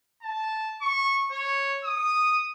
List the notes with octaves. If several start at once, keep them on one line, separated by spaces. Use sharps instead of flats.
A5
C#6
C#5
D#6